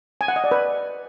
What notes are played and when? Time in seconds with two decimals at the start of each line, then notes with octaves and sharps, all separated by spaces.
0.21 G#5
0.28 F#5
0.36 D#5
0.44 D5
0.51 B4